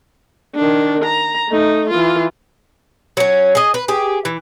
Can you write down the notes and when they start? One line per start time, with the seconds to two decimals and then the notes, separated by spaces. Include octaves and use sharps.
0.56 D#3 D4
1.05 A#5
1.49 A3 D#4
1.90 E3 F4
3.17 F#3 C#4
3.55 G#4 D#5
3.74 B4
3.88 G4 G#4
4.25 E3